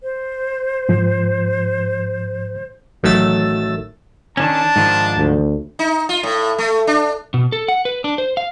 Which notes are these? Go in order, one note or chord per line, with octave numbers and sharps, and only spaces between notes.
C5
G#2 F3
A1 D#3 F#3 A3 E6 A6
D#3 E3 C#4 D4 A5
G#2 D#3 F3
D2
D#4
F4
A2
A3
D4
B2
A4
F#5
B4
D4
C5
F5